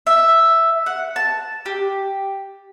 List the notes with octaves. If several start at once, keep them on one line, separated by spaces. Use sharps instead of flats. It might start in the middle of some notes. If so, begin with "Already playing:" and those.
E5
F#5
A5
G4